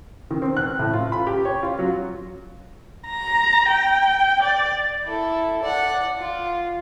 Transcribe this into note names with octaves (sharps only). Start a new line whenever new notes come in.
D#3
C4
F#6
A2
F4
B5
G4
C#5
F4
F#3
A#5
G5
D5
E4 A4
D5 F#5
F4